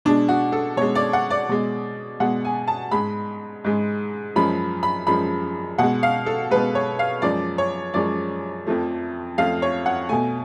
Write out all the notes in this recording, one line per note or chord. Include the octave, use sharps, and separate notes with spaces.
B2 G#3 D4
F#4
A4
B2 G#3 C#5
D5
F#5
D5
B2 G#3
B2 G#3 F#5
G#5
A5
G#2 G#3 B5
G#2 G#3
F#2 F3 G#3 B5
B5
F#2 F3 G#3 B5
B2 G#3 F#5
F5
A4
B2 G#3 B4
C#5
F5
F#2 F3 G#3 D5
C#5
F#2 F3 G#3 D5
F2 F3 A3
F2 F3 A3 F5
C#5
F#5
B2 A3 G#5